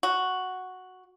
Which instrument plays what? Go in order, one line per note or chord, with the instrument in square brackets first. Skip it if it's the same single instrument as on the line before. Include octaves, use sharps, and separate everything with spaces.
[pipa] F#4